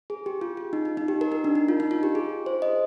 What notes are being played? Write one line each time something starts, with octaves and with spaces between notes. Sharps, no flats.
G#4
G4
F4
F4
D#4
D#4
D#4
G4
A#4
D#4
D4
D#4
F4
D#4
F4
G4
G#4
C5
D#5